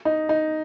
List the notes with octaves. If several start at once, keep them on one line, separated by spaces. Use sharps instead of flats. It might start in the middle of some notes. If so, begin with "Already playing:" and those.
D#4
D#4